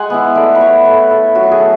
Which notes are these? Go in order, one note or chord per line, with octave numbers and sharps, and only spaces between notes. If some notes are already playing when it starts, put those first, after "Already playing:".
Already playing: G#3 F#5 G#5
B3 E4
A3 D5
B4
E4 C#5
A3 B4
E4 A4
F#3 F#4
G#4
A3